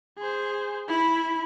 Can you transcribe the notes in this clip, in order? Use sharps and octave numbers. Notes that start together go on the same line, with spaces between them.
G#4 C5
E4 B5